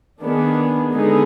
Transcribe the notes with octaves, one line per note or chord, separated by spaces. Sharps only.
D#3 B3 D4 G#4
D3 G#3 B3 D#4 G#4